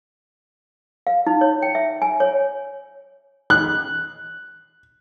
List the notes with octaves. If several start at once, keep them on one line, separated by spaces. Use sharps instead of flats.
F5
D#4
C#5
G5
E5
G#5
C#5
F#6